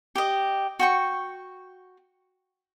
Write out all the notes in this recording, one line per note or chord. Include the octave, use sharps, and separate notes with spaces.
G4 D#5
F#4 G5 C#6